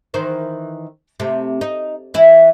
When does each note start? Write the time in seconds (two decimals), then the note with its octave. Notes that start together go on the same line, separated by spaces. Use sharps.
0.14 D#3 E3 C5
1.20 C3 A3
1.61 D#4
2.14 E3 E4